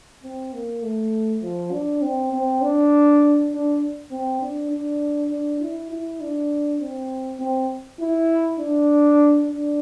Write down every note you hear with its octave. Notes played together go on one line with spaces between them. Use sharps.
C4
A#3
A3
F3
D4
C4
C4
D4
D4
C4
D4
D4
D4
E4
E4
D4
C4
C4
E4
D4
D4